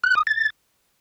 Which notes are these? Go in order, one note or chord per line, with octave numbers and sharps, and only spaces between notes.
F#6
D#6
A6